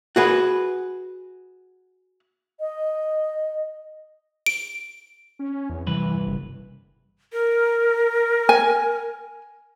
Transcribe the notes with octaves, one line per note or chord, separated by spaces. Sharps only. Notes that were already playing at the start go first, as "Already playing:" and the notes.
F#4 G#4 B4
D#5
D7
C#4
E2
C2 G2 E3 B4
F#1
A#4
G#5